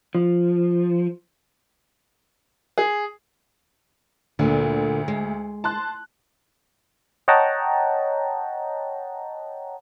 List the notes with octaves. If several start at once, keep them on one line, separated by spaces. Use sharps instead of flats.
F3
G#4
D2 A#2 D3
G#3
A5 C6 F#6
C#5 D#5 F#5 G5 A5 A#5